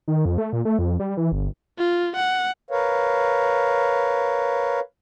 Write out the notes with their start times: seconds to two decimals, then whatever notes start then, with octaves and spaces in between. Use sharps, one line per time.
0.08 D#3
0.25 F2
0.38 A3
0.53 A#2
0.65 A3
0.79 F2
1.00 G3
1.17 E3
1.32 G1
1.78 F4
2.16 F#5
2.71 A#4 B4 C#5 F5